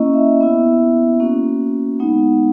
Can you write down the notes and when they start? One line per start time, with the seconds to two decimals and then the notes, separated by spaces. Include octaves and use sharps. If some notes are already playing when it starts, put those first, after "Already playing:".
Already playing: A#3 C#4 E4 D#5
0.14 E5
0.40 B3 E4
1.20 A#3 C#4 F#4
1.99 G#3 B3 D#4 F#5